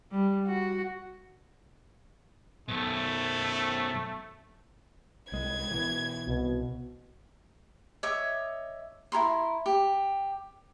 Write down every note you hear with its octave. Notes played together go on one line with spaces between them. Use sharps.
G3
F#4
F#2 B2 A3
C2 G#3 G#6
B2 E3
C2 B2
C#5 D#5 E5 D6
E4 G#4 A#5 C6
G4